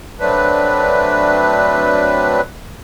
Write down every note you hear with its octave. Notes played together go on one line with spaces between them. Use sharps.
F#3 A3 C4 D4 B4